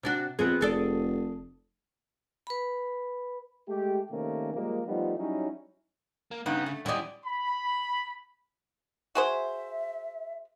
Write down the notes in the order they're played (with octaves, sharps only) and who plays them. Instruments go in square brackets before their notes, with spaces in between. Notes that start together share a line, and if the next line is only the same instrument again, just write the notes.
[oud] C3 D4 F#4
[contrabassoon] F2 [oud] B3 C4 G#4
[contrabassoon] F1 [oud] G#4 A4 D5
[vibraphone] B4 B5
[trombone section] G#3 A3 G4
C3 D#3 A3 A#3 C#4
F3 G3 G#3 A#3
F3 G3 A3 B3 D#4
F#3 G3 C#4 D#4 E4
[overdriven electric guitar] A#3
[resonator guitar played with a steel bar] G2 B3 D#4 [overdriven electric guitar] C#3
[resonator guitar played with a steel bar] A3
[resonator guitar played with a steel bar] E2 D#5 [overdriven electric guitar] C#4 G4 [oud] E4 D5
[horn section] B5
[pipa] F#4 G#4 C5 [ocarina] E5